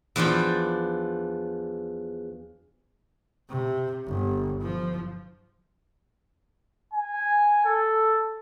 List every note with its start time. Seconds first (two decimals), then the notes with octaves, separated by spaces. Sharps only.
0.16 E2 F3 D4 D5 G5
3.49 C3
4.07 G1
4.62 F3
6.93 G#5
7.65 A4